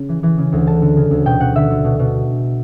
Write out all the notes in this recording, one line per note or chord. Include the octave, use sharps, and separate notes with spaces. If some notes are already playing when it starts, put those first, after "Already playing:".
Already playing: C#3
E3
E3
C#3
D2
D3 A5
D3
C#3
D2
B2 G5
B2 F#5
D3 E5
D3
B2
B2